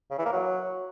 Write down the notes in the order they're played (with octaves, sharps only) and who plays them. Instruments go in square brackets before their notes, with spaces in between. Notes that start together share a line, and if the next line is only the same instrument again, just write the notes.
[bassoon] C#3
E3
A#3
F#3